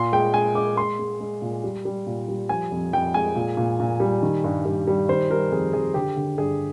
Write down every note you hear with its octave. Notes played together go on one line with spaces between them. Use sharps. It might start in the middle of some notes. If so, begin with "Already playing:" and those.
Already playing: A#2 C6
G#3 G5
G#3 G#5
G#3 D6
G#3 C6
G#3
G#3
A#2
G3
G3
A#2
G3
F3 G#5
F2
F2 G5
G#3 G#5
A#2
A#2
A#2
G3
D#3
G2
G2
G3
D#3 C5
G3 A#4
F2 G#4
F2 G#4
D3 G4
D3
G2 G#4